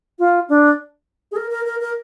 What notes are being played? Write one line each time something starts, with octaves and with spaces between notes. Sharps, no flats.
F4
D4
G#4
A#4
A#4
A#4
A#4